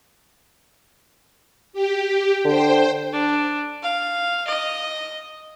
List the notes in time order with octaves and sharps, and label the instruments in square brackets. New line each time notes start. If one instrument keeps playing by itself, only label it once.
[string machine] G4
[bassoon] D3 [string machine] C5 G5
[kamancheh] D4
F5
D#5